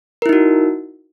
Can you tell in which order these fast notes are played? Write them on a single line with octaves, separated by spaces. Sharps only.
A#4 E4 D#4 F#4